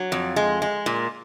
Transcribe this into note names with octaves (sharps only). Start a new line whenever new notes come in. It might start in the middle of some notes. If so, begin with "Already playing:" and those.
Already playing: F#3
F2
G#3
G#3
A#2